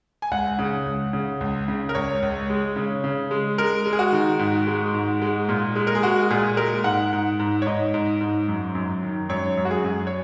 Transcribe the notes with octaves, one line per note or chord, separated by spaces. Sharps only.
G#5
C#2 F#5
C#3
C#2
C#3
C#2
C#3
A#4
C#2 C#5
C#2
G#3
C#3
C#3
G#3
G#3 A#4
G#3
G#4
F#4
D#3
G#2
G#3
G#2
G#3
A#2
G#3
A#4
G#4
G#3 F#4
A#2 G#4
G#3 A#4
G#2 F#5
G#2
G#2
C#5
G#2 D#5
G#2
G#2
F#2
F#2
D#3
F#2 C#5
F#2
F#4
G#4
F#2
C#5